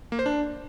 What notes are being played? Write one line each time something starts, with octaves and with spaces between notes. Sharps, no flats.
A#3
C5
D4